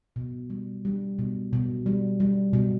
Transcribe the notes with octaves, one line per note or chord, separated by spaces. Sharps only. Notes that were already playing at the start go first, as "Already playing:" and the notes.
B2
G3
G3
B2
B2
G3
G3
B2